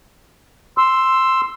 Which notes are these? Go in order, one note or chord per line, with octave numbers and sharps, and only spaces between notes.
C6 E6